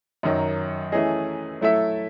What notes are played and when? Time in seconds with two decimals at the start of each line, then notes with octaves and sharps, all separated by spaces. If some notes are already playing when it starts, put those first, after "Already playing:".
0.23 F#2 D#3 F#3
0.92 E3 A3 C#4 G#4 D#5
1.61 F#3 A3 E4 A4 E5